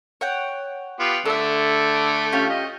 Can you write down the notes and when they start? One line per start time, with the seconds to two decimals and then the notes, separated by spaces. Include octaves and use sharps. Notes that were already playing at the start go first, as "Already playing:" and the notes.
0.21 C#5 F#5 G5
1.00 B3 F4 G4
1.26 D3 A3 A4 E5
2.32 C#4 F4 G4
2.49 D#5